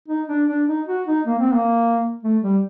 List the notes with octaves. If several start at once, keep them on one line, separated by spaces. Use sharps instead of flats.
D#4
D4
D4
D#4
F#4
D#4
A#3
C4
A#3
A3
G3